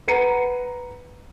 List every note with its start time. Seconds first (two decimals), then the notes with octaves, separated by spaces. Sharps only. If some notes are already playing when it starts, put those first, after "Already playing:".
0.08 B4 F#5 A#5 C#7 D#7